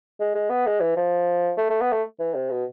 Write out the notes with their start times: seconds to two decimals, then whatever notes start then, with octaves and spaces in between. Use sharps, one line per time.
0.20 G#3
0.35 G#3
0.50 B3
0.66 G#3
0.81 E3
0.97 F3
1.58 A3
1.70 A3
1.81 B3
1.92 A3
2.20 E3
2.35 C3
2.50 B2